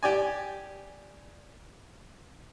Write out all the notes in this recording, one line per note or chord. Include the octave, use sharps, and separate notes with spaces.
G4 D5 G#5